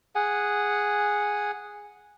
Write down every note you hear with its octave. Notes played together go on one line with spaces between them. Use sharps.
G#4 F#5 G#5